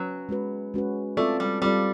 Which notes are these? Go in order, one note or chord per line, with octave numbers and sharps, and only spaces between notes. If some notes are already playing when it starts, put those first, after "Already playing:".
Already playing: F#3 C#4 F#4 B4
G#3 C#4 F#4 B4
G#3 C#4 F#4 B4
A3 C4 F4 A4 D5
G3
G3 C4 F4 A4 D5